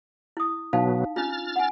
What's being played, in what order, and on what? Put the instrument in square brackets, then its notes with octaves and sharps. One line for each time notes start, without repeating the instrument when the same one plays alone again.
[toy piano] E4 D#6
[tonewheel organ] B2 F#3 B3 [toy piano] D#4 F5 A5
[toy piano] C#4 D4 F4 [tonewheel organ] F6 A6
[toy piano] F#5 G#5